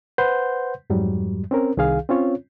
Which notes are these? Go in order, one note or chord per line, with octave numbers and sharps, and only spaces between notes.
B4 C5 F#5 C6 G6
F2 G#2 F#3 G3
C4 C#4 A#4
C2 D#3 G#4 F5
C4 C#4 F4 C#5